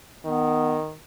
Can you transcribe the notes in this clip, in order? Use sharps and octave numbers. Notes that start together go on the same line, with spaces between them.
D#3 B3